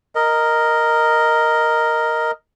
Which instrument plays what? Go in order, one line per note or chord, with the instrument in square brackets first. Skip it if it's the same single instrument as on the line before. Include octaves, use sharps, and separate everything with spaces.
[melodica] A#4 D#5